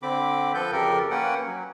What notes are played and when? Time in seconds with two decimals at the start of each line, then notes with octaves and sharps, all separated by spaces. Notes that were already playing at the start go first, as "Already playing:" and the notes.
0.03 D3 C4 B5 D6
0.54 F3 A4 B4 G6
0.72 F2 C#3 G4 A4 A#4
1.11 A#3 C#4 B4 F#5 G5
1.46 F#3